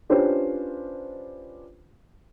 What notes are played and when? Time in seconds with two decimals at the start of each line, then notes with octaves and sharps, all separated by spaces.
0.09 C#4 D4 F4 G4 B4 C5